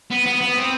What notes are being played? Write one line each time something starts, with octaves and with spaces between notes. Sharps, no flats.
B3
B3
B3
C4